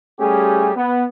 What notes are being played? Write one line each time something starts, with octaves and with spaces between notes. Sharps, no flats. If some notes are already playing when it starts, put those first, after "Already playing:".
G3 A3 C#4 G4 G#4
B3